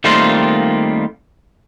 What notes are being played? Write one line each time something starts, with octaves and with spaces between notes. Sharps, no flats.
D#3 G3 A3 A#3 C4 F4